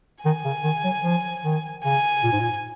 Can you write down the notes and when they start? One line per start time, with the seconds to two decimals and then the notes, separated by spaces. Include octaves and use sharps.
0.24 D#3 G#5
0.45 C#3
0.64 D#3
0.84 F#3
1.04 F3
1.44 D#3
1.84 C#3 G#5
2.24 A#2
2.32 G#2
2.40 A#2